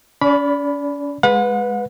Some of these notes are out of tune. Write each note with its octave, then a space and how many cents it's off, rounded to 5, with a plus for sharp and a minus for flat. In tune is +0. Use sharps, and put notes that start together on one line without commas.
C#4 +40 D5 -25 B5 +0
G#3 +0 B4 +0 F#5 -40